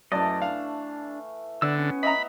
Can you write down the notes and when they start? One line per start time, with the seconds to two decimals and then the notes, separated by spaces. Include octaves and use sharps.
0.12 F#2 E3 A3 D5 D#5
0.42 D4 F5
1.62 D3 B3 D5 E6
1.78 C#4
2.03 D#5 E5 A#5 B5